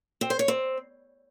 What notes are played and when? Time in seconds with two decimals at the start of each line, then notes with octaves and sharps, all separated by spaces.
0.21 C4
0.30 C5
0.39 C#5
0.48 C4